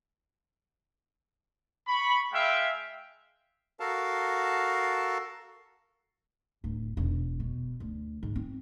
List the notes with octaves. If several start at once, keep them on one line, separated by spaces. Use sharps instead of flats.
B5 C#6
G#3 E5 F5 G5
F#4 A4 A#4 F5 A5
D1
E1
B2
D2
G#2
C4